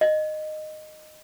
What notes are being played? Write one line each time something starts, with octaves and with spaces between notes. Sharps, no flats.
D#5